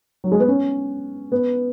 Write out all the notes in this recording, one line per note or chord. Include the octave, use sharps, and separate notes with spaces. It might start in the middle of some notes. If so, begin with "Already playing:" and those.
F#3
G#3
B3
C#4
B3